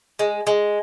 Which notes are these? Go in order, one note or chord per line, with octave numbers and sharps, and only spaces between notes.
G#3
G#3